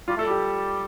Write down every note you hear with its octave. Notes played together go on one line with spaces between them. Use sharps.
G3 F4
A3 A4
G3 G4